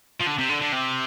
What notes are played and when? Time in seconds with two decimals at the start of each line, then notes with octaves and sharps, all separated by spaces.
0.21 F3
0.27 D3
0.39 C3
0.49 D3
0.61 D3
0.72 C3